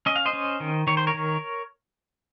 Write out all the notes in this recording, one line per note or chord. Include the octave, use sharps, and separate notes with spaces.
C#4 D#5
F5
C5 D#5
C#4
D#3
D#3 C#5
C5
A#4 C#5
D#3